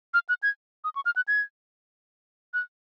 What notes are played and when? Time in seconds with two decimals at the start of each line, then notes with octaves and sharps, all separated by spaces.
0.14 F6
0.29 F#6
0.43 G#6
0.84 D#6
0.95 C#6
1.06 F6
1.16 F#6
1.28 G#6
2.54 F#6